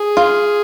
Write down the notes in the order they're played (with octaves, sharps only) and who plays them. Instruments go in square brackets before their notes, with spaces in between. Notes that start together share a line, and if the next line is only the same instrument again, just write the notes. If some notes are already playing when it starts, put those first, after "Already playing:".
Already playing: [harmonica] G#4
[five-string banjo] F4